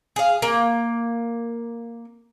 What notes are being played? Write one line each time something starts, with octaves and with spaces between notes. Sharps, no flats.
G#4 F5
A#3